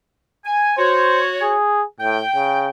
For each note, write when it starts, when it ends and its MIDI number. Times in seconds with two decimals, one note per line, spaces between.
0.45 0.76 80
0.78 1.55 66
0.78 1.21 72
0.78 1.55 73
1.42 1.83 68
2.00 2.22 45
2.00 2.69 79
2.35 2.68 49